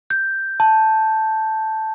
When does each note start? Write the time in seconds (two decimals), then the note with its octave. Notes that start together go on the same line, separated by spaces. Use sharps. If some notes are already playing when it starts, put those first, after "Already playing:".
0.10 G6
0.60 A5